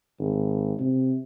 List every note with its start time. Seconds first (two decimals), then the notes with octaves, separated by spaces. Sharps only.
0.20 G#1
0.80 C3